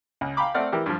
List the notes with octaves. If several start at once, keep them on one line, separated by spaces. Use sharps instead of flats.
C#2
F5 G5 A#5 B5 D6
A3 C4 D5 F#5 F6
E3 G4 A#4
G2 F3